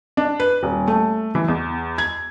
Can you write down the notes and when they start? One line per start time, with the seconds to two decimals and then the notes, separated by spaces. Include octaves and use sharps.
0.17 D4
0.40 B4
0.63 D#1
0.88 A3
1.35 E3
1.48 E2
1.98 G#6